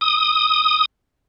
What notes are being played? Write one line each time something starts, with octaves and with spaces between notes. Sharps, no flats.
D#6